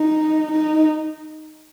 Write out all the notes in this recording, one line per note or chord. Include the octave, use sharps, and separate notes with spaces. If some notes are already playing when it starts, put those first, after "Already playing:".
Already playing: D#4
D#4